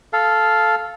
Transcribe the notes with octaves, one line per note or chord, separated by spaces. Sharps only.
A4 F5